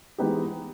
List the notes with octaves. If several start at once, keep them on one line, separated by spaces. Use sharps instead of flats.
E3 G#3 B3 D#4 G4